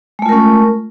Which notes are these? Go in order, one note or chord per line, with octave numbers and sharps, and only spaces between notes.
G#3 A3 C#4 F4 A#4